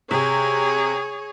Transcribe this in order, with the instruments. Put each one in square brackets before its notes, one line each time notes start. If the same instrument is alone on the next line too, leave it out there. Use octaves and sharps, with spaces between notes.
[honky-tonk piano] C3 [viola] G#4 C#5